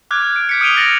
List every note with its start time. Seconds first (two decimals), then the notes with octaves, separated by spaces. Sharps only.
0.11 D6 F6 F#6 G#6
0.24 F6
0.36 D7
0.49 G6 B6 C#7
0.61 D#6 F6 D7 D#7 F7 G7
0.77 F6 A6 A#6 C#7 F#7